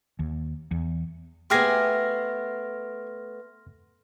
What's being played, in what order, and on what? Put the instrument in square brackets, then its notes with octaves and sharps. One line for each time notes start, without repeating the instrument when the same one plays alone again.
[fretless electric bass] D#2
E2
[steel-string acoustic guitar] A3 B3 [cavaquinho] G4 G#4 G#5 [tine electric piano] C6 F6 A#6